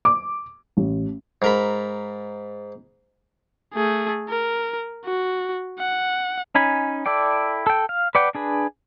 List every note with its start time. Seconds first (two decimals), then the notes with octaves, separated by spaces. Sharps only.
0.05 D6
0.77 A1
1.42 G#2 A#4 B5
3.74 A3 G#4
4.29 A#4
5.05 F#4
5.79 F#5
6.55 C#4 D#4 G#5 B5
7.06 E4 A4 D5 G5
7.67 A4 G5
7.89 F5
8.15 B4 D5 F#5 G5
8.35 D4 G#4 B4